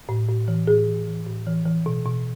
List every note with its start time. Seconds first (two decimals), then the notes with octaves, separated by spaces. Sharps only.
0.09 A2
0.28 A2
0.48 E3
0.67 A2 G#4
0.87 E3
1.07 E3
1.27 A2
1.46 E3
1.65 E3
1.86 B2
2.06 B2